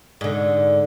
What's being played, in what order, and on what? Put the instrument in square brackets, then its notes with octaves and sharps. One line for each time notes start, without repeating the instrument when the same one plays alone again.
[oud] G#2 D3